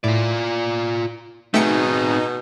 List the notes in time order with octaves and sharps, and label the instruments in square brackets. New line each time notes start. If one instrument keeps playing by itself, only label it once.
[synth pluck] A2 [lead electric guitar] F4 D5
[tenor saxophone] B2 [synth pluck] A3 G5 C#7 [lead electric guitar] C4 G#4 [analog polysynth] D#4